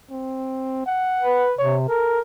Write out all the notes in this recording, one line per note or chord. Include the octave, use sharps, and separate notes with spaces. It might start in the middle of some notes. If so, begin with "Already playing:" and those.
C4
F#5
B4
C3 C#5
A4 A#4